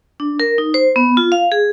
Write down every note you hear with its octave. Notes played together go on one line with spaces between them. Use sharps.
D4
A#4
D#4
C5
B3
F4
F5
G#4